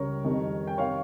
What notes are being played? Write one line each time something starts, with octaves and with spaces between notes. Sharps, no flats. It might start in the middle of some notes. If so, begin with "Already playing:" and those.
Already playing: C#2 C#3 G3 A#4 C#5
F2 D#3 G3
G5
C3 D#3 C#5 F5